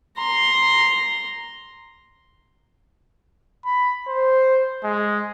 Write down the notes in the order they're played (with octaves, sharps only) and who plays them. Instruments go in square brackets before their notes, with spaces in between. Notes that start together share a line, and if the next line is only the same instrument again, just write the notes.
[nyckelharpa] A#5 C6
[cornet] B5
C5
G#3